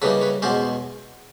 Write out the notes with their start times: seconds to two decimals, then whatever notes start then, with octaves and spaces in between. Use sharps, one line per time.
0.02 C#3 E3 G3 A#3 D#4 A4 B4
0.21 B4 C#5
0.42 E2 B2 G#3 C#4 C5 D5